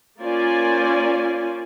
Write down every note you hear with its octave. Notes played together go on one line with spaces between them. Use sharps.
A#3 C#4 F4 C5 D5 G#5